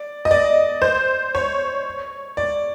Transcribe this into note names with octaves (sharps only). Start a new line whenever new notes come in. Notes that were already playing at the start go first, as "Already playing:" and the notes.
Already playing: D5
D#5
D5
C5
C#5
D5